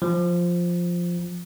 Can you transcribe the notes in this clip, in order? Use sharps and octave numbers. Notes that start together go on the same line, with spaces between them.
F3